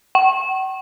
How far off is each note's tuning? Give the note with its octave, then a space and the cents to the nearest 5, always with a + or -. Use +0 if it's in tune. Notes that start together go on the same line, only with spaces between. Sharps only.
F#5 +45